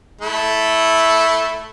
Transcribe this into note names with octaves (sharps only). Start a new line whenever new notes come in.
A3 E4